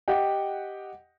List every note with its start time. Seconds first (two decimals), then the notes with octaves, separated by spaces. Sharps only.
0.08 G4 D#5 F#5 G5